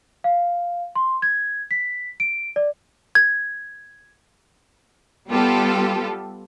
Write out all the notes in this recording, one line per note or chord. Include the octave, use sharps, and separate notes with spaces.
F5
C6
G#6
B6
D7
D5
G#6
G3 B3 F4 G4 A4